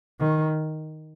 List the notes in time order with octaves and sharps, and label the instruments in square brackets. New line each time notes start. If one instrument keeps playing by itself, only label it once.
[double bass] D#3